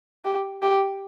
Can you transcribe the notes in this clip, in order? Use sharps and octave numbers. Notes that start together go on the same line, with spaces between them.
G4
G4